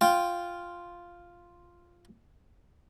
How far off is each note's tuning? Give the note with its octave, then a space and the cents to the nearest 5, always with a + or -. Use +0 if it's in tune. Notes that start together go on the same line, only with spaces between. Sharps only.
F4 +0 G5 +0